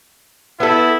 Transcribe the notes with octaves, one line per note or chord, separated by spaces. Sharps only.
B3 E4 A4